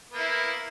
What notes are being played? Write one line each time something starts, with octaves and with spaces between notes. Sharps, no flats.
A#3 B3 E4